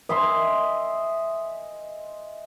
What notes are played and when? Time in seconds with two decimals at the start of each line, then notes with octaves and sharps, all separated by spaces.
0.09 D#5 E5 G#5 C6